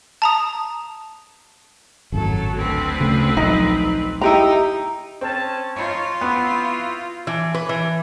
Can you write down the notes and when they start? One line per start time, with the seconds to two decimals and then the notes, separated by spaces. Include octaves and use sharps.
0.22 A5 A#5 D#6
2.12 G#1 F#2 A2 F#3 A4
2.55 D2 C4 B4
3.00 C#3 A3
3.37 A#1 F3 F#3 D#4
4.21 D#4 E4 G4 A#5
5.21 C4 C#4 A5
5.76 D#4 F4 C#5
6.21 B3 C4 E4 F#4
7.27 E3
7.54 B4
7.69 E3